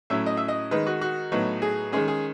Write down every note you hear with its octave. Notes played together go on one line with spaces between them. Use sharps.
A2 F#3 C#4 E4 E5
D#5
E5
D#5
D#3 G#3 D#4 B4
F#4
F#4
A2 F#3 B3 D#4
G#4
D#3 G#3 C#4 G#4
G#4